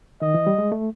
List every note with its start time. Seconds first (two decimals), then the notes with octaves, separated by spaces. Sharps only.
0.22 D#3 D#5
0.34 E3
0.47 G3
0.58 G#3
0.72 A3